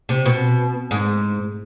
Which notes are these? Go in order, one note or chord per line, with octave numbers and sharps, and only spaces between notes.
C3
B2
G#2